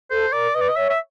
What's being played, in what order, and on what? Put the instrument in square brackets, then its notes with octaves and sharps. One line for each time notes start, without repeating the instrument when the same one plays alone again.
[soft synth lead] A4 [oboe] C5
[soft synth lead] A#4 [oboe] D5
[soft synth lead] B4 [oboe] D#5
[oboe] D5
D#5
[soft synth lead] C#5 [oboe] E5
[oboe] E5